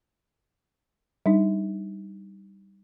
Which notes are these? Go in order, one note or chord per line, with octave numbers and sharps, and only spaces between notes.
G3 D4 D#4